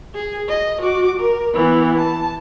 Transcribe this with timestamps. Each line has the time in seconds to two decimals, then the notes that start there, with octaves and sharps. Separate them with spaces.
0.14 G#4
0.49 D#5
0.82 F#4 D6
1.19 A#4
1.54 E3 B3
1.98 A5